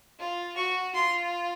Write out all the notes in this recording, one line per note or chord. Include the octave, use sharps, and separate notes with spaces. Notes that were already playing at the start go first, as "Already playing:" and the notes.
F4
F#4 C#6
F4 C6